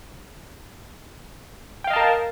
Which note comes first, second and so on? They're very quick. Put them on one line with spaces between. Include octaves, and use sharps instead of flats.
G5 F5 D#5 A5 A#4